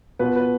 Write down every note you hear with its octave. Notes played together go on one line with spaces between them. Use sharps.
B2 B3 F4 B4
B4